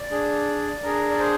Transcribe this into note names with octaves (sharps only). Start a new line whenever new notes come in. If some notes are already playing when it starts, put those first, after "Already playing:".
Already playing: D5
D4 G#4
D4 G#4 A#4
D5
C5